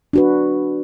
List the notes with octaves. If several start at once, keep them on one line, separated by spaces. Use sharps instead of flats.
D4 F#4 B4